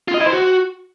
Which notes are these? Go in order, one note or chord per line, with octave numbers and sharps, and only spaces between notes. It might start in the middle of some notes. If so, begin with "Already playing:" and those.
F4
D#5
E4
C5
F#4